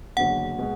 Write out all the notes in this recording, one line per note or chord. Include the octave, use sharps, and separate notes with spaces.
F#1 E2 D3 F#3 F#5
B2 G#3